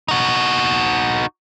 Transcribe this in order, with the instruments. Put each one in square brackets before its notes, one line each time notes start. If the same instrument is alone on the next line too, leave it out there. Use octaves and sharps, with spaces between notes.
[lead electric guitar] D#4 F#4